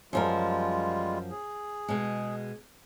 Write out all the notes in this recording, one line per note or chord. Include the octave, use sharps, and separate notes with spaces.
F#2 F3 G3 G#3 F4 A#4
G#4
B2 G#3